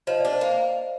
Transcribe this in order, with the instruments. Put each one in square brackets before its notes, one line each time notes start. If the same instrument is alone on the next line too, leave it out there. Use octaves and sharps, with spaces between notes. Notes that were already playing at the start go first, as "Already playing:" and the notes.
[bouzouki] F3 [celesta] D#5
[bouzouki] D4 [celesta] D5
[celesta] C5
[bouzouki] A#3